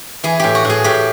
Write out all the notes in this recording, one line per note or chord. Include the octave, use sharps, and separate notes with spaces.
E3 G#4
A2 G4
F#4
A2
G#4
A2 G4